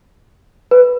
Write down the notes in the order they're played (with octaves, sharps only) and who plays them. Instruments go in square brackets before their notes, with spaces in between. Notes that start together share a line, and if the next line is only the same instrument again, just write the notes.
[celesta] B4